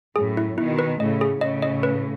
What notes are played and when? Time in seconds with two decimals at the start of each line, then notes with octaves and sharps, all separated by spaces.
0.16 F#2 A2 G#4
0.37 E4
0.58 B2 D#3 E4
0.79 B4
1.00 A2 C#3 D#5
1.21 G#4
1.41 A2 C#3 D#5
1.62 D#5
1.83 B4